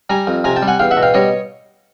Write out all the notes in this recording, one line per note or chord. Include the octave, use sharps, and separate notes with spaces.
G3 G#5 A#5
F2
C3 G#5 A#5
G5 A5
G3
F#5 G#5
E2 F5 G5
E5 F#5
B2
F5 G5
G3 C#5 D#5